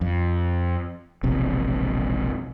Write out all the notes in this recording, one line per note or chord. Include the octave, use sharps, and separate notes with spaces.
F2
E1 A#1 C3